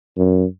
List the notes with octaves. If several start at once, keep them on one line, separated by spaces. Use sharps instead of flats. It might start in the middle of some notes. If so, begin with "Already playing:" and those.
F#2